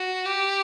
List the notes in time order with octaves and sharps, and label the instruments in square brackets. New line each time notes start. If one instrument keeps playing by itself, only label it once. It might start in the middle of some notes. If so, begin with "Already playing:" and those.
Already playing: [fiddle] F#4
G4